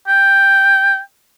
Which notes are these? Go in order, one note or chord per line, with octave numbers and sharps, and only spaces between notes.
G5